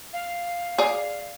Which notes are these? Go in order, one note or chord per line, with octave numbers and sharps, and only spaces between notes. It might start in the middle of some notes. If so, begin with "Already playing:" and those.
F5
G#4 D5